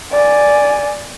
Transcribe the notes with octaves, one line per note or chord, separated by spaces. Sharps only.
D5 G#5